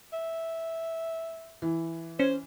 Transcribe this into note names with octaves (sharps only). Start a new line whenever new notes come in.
E5
E3
C#4 C5